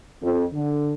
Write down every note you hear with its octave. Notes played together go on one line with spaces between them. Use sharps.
F2
D3